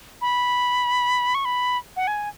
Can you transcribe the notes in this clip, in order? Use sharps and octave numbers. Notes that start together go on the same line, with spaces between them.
B5
C#6
B5
F#5
G#5